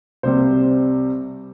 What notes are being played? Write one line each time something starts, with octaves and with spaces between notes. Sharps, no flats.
C2 C3 G3 C5